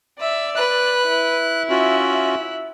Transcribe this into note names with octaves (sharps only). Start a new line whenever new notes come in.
D5 E5
B4 F#6
E4
C#4 F4 F#4 E5 F#6